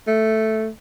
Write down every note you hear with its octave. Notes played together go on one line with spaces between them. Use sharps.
A3